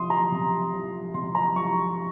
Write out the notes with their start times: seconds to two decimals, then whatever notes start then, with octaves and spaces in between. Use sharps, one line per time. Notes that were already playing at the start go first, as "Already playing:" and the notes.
Already playing: C3 F3 C6 D#6
0.10 A#5
0.32 C3
0.73 F3
1.14 C3 C6
1.35 A#5
1.56 F3 C#6